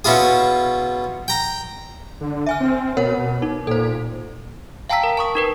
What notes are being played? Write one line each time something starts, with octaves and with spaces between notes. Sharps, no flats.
B2 C#4 E4 F4 G#4
G5 A#5
D3
E5 G#5 F6
C4
B2 A#4 C#5 F#5
D#4
A#2 A4 C5
F5 G5 A5 A#5 E6 B6
A#4
A5 C#6 D#6
D#4 A#4 B4